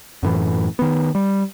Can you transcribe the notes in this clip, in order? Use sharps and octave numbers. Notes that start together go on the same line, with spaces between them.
F#2 A2 E3
D#3 B3
G3